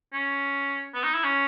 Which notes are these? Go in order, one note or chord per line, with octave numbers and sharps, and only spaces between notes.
C#4
B3
D#4
E4
C#4